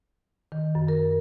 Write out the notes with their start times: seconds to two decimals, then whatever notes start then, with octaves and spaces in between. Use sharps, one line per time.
0.52 D#3
0.75 F#2
0.88 A#4